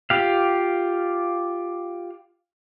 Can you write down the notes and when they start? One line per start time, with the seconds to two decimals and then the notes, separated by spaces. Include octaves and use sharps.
0.10 F4 G4 F5